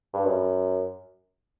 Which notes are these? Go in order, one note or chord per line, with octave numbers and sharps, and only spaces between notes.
G2
F#2